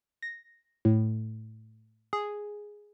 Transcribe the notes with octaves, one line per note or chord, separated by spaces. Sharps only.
A#6
A2
G#4